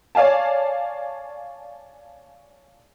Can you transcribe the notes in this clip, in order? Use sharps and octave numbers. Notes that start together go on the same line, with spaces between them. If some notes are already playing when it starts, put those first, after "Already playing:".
C#5 D5 F5 G#5 A5